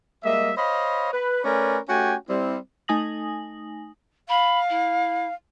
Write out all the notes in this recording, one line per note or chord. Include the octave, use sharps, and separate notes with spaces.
G3 G#3 A#3 D#5 E5
C5 C#5 D#5 F5 B5
B4
A3 C#4 A#4 B4 D5 G#5
A3 C#4 F#4 G4 G5 G#5
G3 C4 E4
A3 D#4 G#5 D#6 A#6 F#7
F5 B5
E4